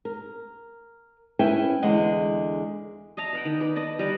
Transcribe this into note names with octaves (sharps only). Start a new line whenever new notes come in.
A#4
C#4 E4 B4 C#5 E5 G5
E2 D3 G#3 D#5 F#5
D#5 E5 A5 A#5
B4 F#5 G5
D#3
B4 D5
B4 D#5 A5
G3 A#4 B4